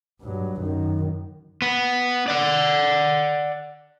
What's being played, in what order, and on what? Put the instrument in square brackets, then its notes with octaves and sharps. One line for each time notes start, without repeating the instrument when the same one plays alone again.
[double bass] G2 F#3
F#2 D#3
[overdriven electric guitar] B3
D5 F#5